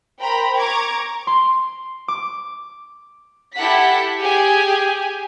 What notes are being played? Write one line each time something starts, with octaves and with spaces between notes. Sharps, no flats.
A#4 C5 G5 A#5 B5
A#5 C#6 D6 G#6
C6
D6
E4 G4 A4 F#5 B6
G4 G#4 G#5